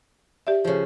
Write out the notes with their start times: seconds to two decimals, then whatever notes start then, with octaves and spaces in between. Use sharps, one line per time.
0.47 G4 D5 E5
0.65 C#3 F3